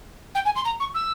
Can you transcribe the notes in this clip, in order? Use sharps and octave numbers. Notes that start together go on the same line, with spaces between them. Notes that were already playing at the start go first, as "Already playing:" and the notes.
G5
G#5
C6
A#5
C#6
E6